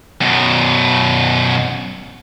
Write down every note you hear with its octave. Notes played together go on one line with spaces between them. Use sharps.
F#2 B2